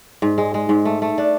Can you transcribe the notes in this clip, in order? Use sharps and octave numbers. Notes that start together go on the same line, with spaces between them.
G#2
G#3
G#3
G#2
A3
A3
D4